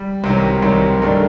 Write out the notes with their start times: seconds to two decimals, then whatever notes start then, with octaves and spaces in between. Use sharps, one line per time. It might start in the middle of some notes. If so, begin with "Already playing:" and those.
Already playing: G3
0.24 C2 C3 D#3 F#3
0.62 C2 C3 D#3 F#3
1.02 G2 D#3 A3 D4